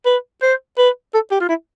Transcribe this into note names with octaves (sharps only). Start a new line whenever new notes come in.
B4
C5
B4
A4
G4
F4
E4